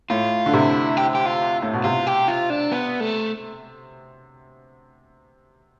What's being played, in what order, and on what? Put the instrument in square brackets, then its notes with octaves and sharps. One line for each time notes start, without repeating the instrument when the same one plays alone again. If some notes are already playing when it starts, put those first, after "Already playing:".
[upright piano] A2 [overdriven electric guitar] F4
[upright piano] D3
[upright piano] C3 [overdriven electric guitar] E4
[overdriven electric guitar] G4
G4
F4
[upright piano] A2
B2
[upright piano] C3 [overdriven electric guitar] F4
[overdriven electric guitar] G4
F4
D4
B3
A3